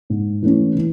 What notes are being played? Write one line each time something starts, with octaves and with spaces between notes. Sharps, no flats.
G#2
E3 A3 C#4
E3